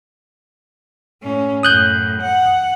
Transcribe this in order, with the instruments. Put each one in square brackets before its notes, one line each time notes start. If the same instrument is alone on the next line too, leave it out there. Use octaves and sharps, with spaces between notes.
[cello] A2 C#4
[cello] F#2 A2 [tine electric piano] D#6 F#6 G6
[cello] F#5